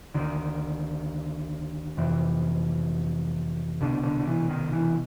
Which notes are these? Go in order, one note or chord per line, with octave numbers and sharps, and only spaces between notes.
D2 D3 D#3
F2 C3 E3
C2 B2 D3
D3
E3
D#3
E3